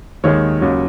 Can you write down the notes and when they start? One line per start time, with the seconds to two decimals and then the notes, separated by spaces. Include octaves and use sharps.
0.23 D#2 D#3 G#3 C#5
0.61 D#2 C#3 F#3